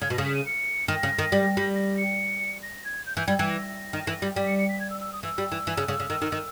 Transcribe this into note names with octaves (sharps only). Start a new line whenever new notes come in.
C#3 G#6
B2
A#6
C#3
B6
D#7
C#7
D#3 A#6
C#3
D#3
G3
G3
A#6
C#7
A#6
G#6
G6
E3 G6
G3 G#6
E3 G#6
A#6
D#3
E3
G3
G3 B6
C#7
C#7
B6
G#6
E6
E6
D#6
E3 E6
G3
E3
E3
C#3
C#3
C#3
D#3
D#3
D#3